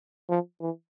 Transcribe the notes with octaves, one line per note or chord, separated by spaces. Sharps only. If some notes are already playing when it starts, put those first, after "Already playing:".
F3
E3